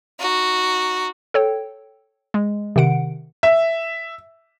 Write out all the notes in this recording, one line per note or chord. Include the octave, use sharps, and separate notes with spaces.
D#4 F#4
A4 C#5 G5
G#3
C3 D#3 F#5 D7
E5